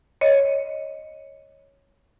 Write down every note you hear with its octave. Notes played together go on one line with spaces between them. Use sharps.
C#5 D#5